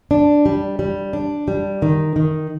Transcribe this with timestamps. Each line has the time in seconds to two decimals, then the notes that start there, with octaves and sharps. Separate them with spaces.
0.11 D4
0.46 G3
0.79 G3
1.13 D4
1.48 G3
1.82 D#3
2.16 D#3